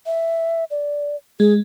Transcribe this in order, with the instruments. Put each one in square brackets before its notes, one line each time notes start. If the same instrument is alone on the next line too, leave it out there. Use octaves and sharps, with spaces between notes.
[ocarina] E5
D5
[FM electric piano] G#3 [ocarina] G#4